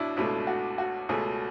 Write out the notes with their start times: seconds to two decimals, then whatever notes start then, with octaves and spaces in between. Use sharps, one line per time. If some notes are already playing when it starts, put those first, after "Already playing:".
Already playing: C#2 B2 D4 E4
0.17 C#2 B2 A3 E4
0.47 F#4
0.78 F#4
1.09 C#2 B2 A3 G#4